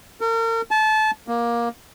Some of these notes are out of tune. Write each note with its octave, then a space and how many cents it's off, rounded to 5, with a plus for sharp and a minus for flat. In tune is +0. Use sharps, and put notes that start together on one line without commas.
A#4 -40
A5 -25
A#3 +15